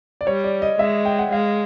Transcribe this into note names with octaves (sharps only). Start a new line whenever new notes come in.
D5
G3 C#5
D5
D#5
G#3 E5
G5
F#5
G#3 F5